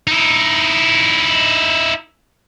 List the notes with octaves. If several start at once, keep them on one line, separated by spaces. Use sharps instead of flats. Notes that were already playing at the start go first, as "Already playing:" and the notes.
D#4 E4